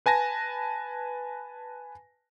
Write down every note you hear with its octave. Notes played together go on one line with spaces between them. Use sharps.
B4 G#5 A5 A#6